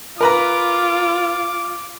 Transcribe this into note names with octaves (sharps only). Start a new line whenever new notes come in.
F4 A#4 B4 A#5 D6